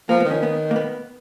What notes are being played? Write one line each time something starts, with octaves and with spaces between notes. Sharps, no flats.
F3 A#3
B3
D#3
C#4
B3
A#3
B3